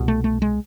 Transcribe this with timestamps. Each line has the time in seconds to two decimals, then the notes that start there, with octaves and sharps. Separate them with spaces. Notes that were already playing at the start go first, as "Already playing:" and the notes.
Already playing: C2 B2
0.08 A3
0.24 A3
0.42 G#3